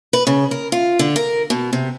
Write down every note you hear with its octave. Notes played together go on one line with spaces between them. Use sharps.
B4
C#3
A#4
F4
D3
A#4
B2
C3